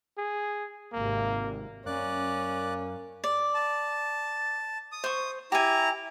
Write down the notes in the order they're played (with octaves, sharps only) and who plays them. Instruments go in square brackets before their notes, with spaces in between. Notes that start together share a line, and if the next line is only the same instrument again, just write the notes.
[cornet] G#4
[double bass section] G#1 C3 [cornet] A#3
[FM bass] F#2 [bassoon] A#3 [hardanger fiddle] C#4 [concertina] D5 F#6
[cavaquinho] D5
[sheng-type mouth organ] A5
D#6
[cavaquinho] C5 C#6
[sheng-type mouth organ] E4 A#5 [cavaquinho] G4 G#5